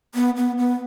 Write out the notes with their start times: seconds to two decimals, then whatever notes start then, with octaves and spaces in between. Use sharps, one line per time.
0.15 B3
0.37 B3
0.58 B3